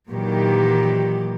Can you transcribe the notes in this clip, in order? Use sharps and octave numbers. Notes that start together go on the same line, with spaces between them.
A#2 D#3 E3 F#3 G4